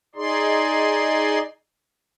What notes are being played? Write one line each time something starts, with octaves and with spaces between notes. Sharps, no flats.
D#4 G#4 D5 C6